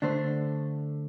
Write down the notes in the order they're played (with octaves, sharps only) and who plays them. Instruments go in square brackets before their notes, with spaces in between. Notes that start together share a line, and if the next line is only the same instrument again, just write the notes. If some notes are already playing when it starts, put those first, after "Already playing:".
[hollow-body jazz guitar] D3 A3 D4 A4 C5